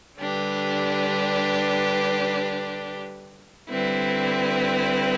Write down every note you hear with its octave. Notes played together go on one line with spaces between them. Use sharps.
D3 G3 D4 G4 B4
D3 G3 C4 E4 B4